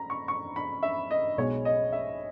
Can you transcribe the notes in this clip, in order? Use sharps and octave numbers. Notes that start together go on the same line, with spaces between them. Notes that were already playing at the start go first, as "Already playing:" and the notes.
Already playing: A#5 B5
C#6
C#6
B5
E5
D#5
B1 B2 G#3 C#5
D#5
E5